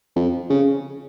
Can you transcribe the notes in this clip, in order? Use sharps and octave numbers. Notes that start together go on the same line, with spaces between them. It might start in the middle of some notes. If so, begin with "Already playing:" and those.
F2
C#3